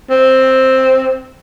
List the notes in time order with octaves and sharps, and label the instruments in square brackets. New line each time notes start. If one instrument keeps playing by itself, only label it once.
[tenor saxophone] C4